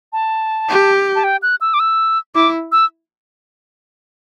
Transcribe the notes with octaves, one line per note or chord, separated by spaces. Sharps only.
A5
G4
A5
G5
F#6
E6
D6
E6
E4 D6
E6